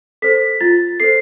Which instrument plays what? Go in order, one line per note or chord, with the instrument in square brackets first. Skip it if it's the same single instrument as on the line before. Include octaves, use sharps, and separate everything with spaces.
[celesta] A4 C5 B6
F4 A6
A4 C5 C7